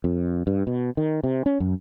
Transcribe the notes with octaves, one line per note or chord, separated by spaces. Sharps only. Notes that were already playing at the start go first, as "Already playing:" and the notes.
F2
G2
B2
D#3
C3
C#4
F#2